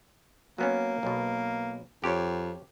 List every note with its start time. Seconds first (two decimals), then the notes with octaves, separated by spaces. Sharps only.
0.58 F#3 A#3 B3 C#4
1.03 B1 B2
2.04 F2 G4 C#5